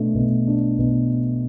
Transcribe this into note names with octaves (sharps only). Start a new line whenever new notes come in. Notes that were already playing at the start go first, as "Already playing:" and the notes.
Already playing: B2 A3 D4
B2
D4
B2